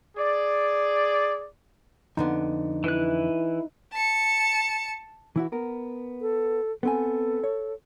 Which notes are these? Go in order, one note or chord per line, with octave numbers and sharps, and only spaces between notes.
G#4 D5
F2 D3 B3 D#4
E3 E4 B4 F#6
A5 C#7
E3 E4 F#4
B3 A#4
A4
B3 C4 A4 G#5
C#5